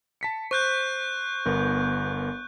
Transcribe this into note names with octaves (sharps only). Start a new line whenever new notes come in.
A5 B6 C#7
C5 C#6 F#6 G6
G1 B3 A#4